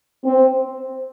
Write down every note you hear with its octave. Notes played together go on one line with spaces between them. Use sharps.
C4